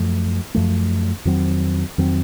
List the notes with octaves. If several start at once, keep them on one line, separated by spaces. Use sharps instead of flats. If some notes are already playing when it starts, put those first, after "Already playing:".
Already playing: F#2 F3 A3
F#2 F3 A3
F2 D#3 F#3 C4
F2 D#3 F#3 C4